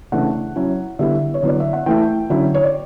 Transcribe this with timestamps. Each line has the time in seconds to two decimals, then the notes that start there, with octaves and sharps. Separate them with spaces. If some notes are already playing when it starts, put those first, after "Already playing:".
0.12 C#3 E3 A3 D4 F#5
0.56 F#3 C#4 E4
0.99 D3 G3 B3 E4 E5
1.34 C#5
1.43 D3 F#3 B3 E4 D5
1.60 E5
1.73 F#5
1.86 E3 A3 E4 G5
2.30 D3 F#3 C#4 E4
2.54 C#5
2.64 D5